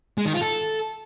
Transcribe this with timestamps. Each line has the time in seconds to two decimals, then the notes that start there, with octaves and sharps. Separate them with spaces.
0.18 G#3
0.26 D#3
0.33 F4
0.41 A4